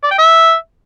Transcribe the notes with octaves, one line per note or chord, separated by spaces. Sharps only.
D5
G5
E5